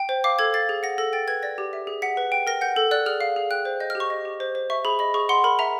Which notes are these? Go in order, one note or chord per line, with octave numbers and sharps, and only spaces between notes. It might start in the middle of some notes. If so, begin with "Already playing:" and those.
Already playing: G5
C5
F5 D6
A4 G#6
F5 A6
G#4
F#5 A#6
A4 A#6
G5 A6
B4 G#6
D5 A#6
G4
E5
G#4
F#5 B6
B4
G5
A#4 A#6
F#5 G6
A4
D5 F#6
G#4 F6
F5
G#4
G5 F#6
C5
D#5 G6
F6
G4
C#6
D#5
G4
C5
C5
E5 C#6
G#4 B5
D#5 B5
G#4 C#6
F#5 C6
A#4 B5
E5 A#5